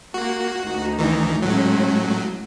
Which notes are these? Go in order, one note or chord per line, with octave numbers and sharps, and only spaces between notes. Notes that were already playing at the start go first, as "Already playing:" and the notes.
A#3 F#4
D2 D#4
D#3 E3
A2 F#3 G#3 A3 C#4